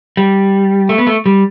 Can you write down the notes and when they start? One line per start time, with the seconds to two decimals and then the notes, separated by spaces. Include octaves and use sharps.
0.17 G3
0.89 A3
0.98 B3
1.07 A3
1.26 G3